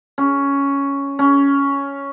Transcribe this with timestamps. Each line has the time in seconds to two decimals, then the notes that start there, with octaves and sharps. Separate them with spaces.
0.18 C#4
1.19 C#4